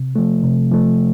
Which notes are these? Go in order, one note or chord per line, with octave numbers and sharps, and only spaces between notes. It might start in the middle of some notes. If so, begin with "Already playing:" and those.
Already playing: C3
F3 A3
C3
F3 A3